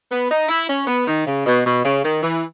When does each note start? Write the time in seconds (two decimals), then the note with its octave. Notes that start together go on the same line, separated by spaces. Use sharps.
0.10 B3
0.30 D#4
0.49 E4
0.68 C#4
0.87 B3
1.07 D#3
1.26 C#3
1.45 B2
1.65 B2
1.84 C#3
2.03 D#3
2.22 E3